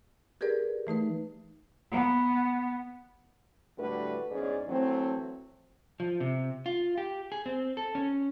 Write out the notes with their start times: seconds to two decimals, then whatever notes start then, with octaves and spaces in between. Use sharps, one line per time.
0.41 G4 G#4 A#4 B4 D5
0.87 E3 A3 D#4 B4
1.92 B3
3.78 A2 D3 G3 A3 F#4 B4
4.31 E2 G#2 C#4 G#4 D5
4.69 E3 F#3 A3 C4
6.00 F3
6.20 C3
6.66 F4
6.98 G4
7.32 G#4
7.46 C4
7.77 A4
7.95 C#4